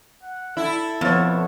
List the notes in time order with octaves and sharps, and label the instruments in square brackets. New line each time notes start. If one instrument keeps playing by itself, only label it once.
[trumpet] F#5
[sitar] E4 [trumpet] A4
[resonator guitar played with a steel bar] F2 [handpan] B3 C#5